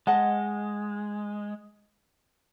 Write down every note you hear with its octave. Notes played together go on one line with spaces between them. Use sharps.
G#3 D#5 F#5 A5